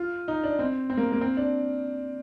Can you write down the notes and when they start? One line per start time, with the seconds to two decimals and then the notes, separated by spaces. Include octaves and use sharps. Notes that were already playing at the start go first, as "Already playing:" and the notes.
Already playing: F4
0.28 D#4
0.44 D4
0.59 C4
0.90 C4
0.97 A#3
1.12 A#3
1.21 C4
1.37 D4